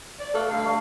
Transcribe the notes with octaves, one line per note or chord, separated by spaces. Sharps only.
D5
A3 A4 B4 F5
D3 G3 D#4 F5
A3